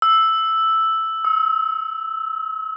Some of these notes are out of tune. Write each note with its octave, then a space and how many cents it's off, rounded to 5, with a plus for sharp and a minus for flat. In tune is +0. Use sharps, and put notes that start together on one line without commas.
E6 +0
E6 -45